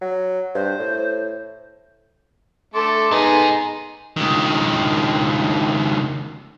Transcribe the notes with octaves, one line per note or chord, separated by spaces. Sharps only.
F#3
G2 C5
A2
A3 A4 C6 D6
G#2 D#3 G#3 B3 D#4 G#4
C#2 D#3